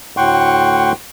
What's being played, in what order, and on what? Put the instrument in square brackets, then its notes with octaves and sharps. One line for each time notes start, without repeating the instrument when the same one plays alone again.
[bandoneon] D2 A2 F#5 G5 C6 C#6